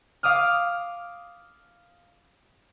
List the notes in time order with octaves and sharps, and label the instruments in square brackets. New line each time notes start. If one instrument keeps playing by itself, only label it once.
[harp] F5 D6 D#6 F6